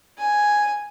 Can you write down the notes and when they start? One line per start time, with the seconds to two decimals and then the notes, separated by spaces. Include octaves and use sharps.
0.18 G#5